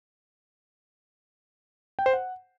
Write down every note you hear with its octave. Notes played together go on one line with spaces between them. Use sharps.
G5
C5
F#5